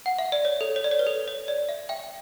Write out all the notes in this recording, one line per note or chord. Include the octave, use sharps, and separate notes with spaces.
F#5
E5
D5
C#5
A4
C#5
D5
C#5
B4
A4
C#5
D5
E5
E5 G5